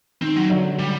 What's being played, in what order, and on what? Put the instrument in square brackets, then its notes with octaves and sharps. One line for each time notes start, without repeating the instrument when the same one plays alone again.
[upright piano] D#3 [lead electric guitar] C4
[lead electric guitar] F#3
[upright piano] D3 F#3
[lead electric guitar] G3